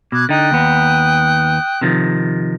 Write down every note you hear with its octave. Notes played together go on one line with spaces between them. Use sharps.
B2 D6 F#6 G#6
D3 D#4 G5 D#6 F#6
D#2 B3
C3 D#3 F3